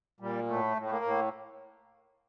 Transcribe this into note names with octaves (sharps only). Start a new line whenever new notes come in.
A#2 G3
A2 A3
A2
A3
A#3
A2